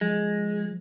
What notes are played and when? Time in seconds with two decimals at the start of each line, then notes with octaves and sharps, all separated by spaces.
0.01 F3 G#3